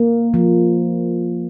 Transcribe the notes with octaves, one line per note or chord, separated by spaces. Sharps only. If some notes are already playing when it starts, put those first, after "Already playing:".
Already playing: A#3
F3